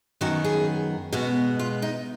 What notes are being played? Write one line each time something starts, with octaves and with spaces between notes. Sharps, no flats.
F#2 D#3 F#3 B3 F#4
G#4
B2 G#3 B3 F#4
F4
D#4